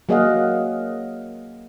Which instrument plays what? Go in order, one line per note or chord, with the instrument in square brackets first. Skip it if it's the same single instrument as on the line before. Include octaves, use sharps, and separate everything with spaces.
[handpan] F#3 A#3 G#4 D#5 F5 F#5